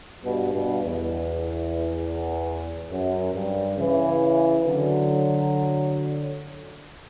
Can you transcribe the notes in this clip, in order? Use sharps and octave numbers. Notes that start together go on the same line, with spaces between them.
G2 B2
G2 B2
E2
F#2
G2
C#3 E3
D3 F#3